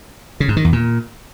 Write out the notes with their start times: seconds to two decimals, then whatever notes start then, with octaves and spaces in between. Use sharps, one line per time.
0.40 C#3
0.48 G#2
0.57 D#3
0.65 E2
0.73 A#2